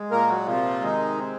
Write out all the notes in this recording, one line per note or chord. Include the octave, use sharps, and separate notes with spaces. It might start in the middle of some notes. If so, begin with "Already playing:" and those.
Already playing: G#3
A#2 A#3 A#4
F#3 F#4
C3 F3 F4
D#3 G#3 D#4
C4